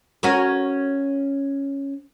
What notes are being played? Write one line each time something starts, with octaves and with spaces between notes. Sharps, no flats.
C#4 F#4 A#4